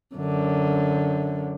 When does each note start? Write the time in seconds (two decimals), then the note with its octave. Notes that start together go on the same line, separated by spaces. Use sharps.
0.16 F#2 D3